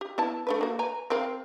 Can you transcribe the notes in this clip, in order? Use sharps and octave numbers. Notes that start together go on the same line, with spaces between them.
G4
B3 E4 A5
A3 D4 B4
A#3 F#4
B4 G#5 A#5
C4 A#4 F5